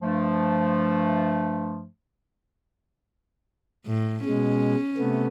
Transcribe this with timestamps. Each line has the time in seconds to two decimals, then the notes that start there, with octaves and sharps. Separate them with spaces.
0.02 G2 F3 A3
3.87 A2
4.25 B2 G#3 C#4
4.98 C3 A3 B3